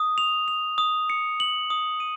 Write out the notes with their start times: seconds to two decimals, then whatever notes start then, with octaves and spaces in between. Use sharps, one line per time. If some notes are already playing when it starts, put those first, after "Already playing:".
Already playing: D#6
0.18 F7
0.48 F7
0.78 D#6
1.10 C#7
1.40 F#7
1.70 D#6
2.00 D#7